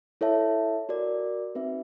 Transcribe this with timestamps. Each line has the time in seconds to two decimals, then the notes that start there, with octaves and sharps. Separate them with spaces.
0.21 E4 A4 C#5 E5 A5
0.89 F#4 A#4 D5
1.55 C4 D#4 F#4 B4 E5